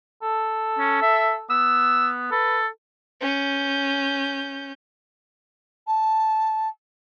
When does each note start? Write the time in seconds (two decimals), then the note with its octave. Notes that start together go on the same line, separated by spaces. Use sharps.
0.22 A4
0.78 C#4
1.02 E5
1.50 B3 E6
2.31 A4 B4
3.21 C#4 G6
5.87 A5